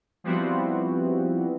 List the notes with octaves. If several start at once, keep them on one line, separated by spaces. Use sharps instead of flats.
F3 G3 B3 C4 E4 F#4